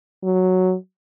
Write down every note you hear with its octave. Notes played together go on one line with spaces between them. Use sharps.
F#3